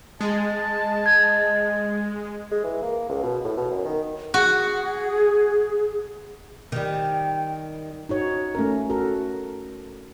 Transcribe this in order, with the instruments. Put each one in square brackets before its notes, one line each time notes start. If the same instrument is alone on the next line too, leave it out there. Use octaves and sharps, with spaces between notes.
[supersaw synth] G#3 [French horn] D#5 [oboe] A5
[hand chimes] G#6
[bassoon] G#3
E3
A#3
C#2
B2
A2
B2
F#2
D#3
[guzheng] F#4 [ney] G#4
[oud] D#3 G3
[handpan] D#4 F#4 C#5
A3 C#4 A#4
F#4 A4 A#4